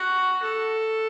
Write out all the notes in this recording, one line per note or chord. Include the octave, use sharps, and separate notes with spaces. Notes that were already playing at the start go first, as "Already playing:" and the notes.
Already playing: F#4
A4